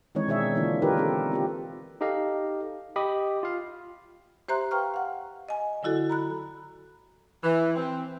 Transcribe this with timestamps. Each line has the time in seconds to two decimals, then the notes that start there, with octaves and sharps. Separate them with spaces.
0.15 D#3 E3 G#3 C4 D#4 C#5
0.27 B2 D4 G#4 C#5 E5
0.55 D3 E3 A#3 D4 F4
0.82 D4 D#4 F4 G4 A#4 B4
0.98 C4 A4
1.31 C4 F4 G4
2.01 D#4 G4 A4 D#5 F5
2.96 G4 D#5 B5 D#6
3.43 F4 F5
4.49 G4 C5 E5 A#5 C6 F#6
4.71 B4 F5 G5 A#5 C#6 F6
4.94 F5 F#5
5.49 D#5 G#5
5.83 D3 F#3 E4 F#4 A4
6.10 A#5 B5 F#6
7.43 E3
7.76 C4